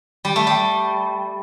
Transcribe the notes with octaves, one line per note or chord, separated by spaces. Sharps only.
G3
A3
G3